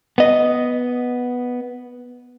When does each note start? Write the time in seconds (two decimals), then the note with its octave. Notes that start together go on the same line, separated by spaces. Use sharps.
0.18 B3 D#5